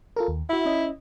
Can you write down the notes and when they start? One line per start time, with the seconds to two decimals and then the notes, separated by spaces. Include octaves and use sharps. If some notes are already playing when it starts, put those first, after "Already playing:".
0.16 F4 A4 A#4
0.28 D#2
0.49 E4 F#4 E5
0.66 C#4 D#5